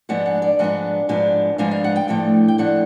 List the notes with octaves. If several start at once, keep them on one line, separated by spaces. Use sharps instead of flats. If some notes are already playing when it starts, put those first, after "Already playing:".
G#2 F3 G#3 B3 D4 F#5
F#5
D5
G#2 F3 G#3 B3 D4 F#5
G#2 F3 G#3 B3 D4
G#2 F3 G#3 B3 D4 F5
F5
F#5
G5
A2 F3 A3 D4 G5
G5
A2 F3 A3 D4 F#5